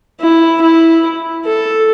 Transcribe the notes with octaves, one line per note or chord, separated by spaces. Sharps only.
E4
E4
A4